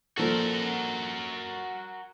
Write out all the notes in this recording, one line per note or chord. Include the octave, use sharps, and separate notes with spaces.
A#2 F3 F#4 A4 A#4